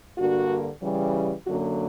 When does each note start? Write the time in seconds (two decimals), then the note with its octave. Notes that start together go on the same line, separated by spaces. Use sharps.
0.17 G2 D3 A#3 F#4
0.81 C#3 E3 G3
1.45 F#2 D3 F#3 A#3 F#4